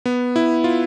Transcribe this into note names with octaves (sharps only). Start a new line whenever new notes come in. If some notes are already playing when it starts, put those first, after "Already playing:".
B3
E4
F4